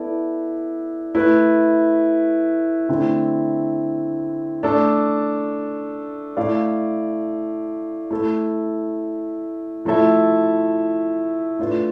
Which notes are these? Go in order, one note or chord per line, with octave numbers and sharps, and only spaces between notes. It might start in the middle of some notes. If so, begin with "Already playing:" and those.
Already playing: B3 E4 A4 D5
A3 E4 B4
D3 A3 C4 E4
A3 D4 A4
A3 E4 A4 D5 F5
A3 E4 A4
F3 A3 E4 A4 E5
A3 D4 F4 B4